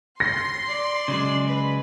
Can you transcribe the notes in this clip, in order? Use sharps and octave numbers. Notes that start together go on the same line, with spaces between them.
C6 A#6
D5
C#3 F#3 G#3
B4